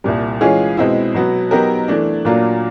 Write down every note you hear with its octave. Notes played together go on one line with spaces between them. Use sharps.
C2 A#2 G3
E3 G#3 C#4 F4 G#4
B2 G#3 C4 E4
B2 F#3 B3
F#3 B3 D#4 G4 A#4
E3 A3 D4
A#2 F#3 A#3 D4 F4